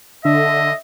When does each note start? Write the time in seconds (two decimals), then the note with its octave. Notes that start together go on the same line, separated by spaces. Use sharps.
0.25 D3 D#5 E5